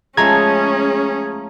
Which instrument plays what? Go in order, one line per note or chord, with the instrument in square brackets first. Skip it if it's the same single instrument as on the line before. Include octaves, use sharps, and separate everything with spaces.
[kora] F3 G#3 A3 [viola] C#4 [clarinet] G#4 [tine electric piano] A#5 G#6